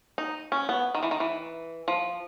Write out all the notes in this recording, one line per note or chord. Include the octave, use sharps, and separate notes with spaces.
D#4
C#4
B3
D#3
E3
D#3
E3
F3